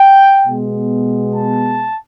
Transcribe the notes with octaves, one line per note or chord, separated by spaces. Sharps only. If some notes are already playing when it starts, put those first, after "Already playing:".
Already playing: G5
B2 G#3 B3
A5